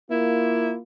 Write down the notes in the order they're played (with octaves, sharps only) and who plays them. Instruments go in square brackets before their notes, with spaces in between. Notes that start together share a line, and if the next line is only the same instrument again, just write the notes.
[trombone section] A#3 F4 [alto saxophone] E4